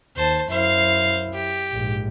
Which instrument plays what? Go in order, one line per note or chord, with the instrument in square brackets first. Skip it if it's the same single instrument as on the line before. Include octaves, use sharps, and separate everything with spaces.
[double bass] D#2 [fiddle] C5 A5
[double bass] F#2 E4 [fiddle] C5 F5
[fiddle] G4
[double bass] A#1 G#2